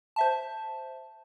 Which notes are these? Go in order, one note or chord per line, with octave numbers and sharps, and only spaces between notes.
C5 E5 A5